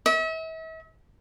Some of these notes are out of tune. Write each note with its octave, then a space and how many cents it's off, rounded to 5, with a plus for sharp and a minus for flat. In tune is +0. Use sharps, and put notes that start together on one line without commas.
E5 -40